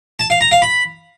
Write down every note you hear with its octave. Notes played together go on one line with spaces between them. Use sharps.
A5
F5
A#5
F5
B5